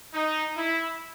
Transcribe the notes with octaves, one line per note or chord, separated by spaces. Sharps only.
D#4
E4